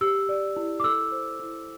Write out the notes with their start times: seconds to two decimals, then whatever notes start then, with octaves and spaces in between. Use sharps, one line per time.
0.01 G4 E6
0.29 D5
0.56 E4
0.80 D6
0.84 A4 E6
1.12 C5
1.39 E4